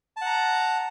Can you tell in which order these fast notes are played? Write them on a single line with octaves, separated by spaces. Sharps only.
A5 F#5 A#5